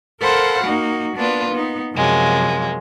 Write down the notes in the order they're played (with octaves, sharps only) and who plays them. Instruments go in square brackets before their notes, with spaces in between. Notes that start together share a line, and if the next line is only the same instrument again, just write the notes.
[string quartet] A4 A#4 C5 F5 F#5 B5
A#3 D#4 F#4
A#3 B3 D4 F4 B4
B3 D#4
F#2 C3 F3 F#3 G#3 A#3